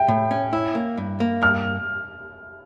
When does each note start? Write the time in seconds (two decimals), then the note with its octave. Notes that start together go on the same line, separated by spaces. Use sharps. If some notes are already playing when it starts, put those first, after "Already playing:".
Already playing: E5 G5
0.08 A2
0.31 C#4
0.53 E4
0.75 A#3
0.97 G2
1.20 A#3
1.42 G2 F6